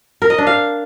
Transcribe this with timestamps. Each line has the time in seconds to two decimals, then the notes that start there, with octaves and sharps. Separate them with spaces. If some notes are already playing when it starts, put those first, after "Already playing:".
0.22 A#4
0.30 D#5
0.38 D4
0.47 F5